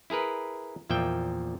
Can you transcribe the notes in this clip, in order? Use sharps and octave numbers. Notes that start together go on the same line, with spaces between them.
E4 G#4 A#4 B4
E2 A#2 F3 E5 G5